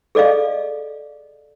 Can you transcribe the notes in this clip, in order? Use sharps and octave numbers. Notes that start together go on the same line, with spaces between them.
G#4 A4 D5 D#5 F5